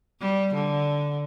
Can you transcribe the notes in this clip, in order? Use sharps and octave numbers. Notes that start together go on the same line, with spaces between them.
G3
D3